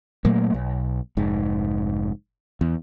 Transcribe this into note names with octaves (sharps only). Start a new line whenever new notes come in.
A#2 F#3 A3 A#3
B1
F1 G#2
E2